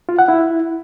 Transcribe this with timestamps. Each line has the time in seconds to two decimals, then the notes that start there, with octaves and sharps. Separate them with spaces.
0.09 F4
0.19 F#5
0.28 E4